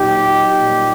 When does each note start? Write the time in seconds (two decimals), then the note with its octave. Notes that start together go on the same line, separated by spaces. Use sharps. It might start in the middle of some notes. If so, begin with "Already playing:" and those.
Already playing: A#2 F#3 D#4 G4
0.57 A#2 G3